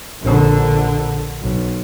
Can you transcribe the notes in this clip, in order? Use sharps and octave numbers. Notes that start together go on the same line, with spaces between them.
A#1 D3
B1